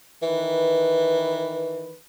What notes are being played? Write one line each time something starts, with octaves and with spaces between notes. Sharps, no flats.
D#3 E3 B4